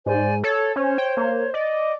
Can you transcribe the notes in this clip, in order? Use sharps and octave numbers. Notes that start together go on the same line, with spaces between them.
G#2 C5 D5 G#5
A4 C#5
C#4 C5 C#5
G5
A#3
D5 D#5